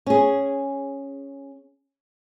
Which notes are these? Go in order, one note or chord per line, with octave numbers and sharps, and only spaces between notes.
C#4 G#4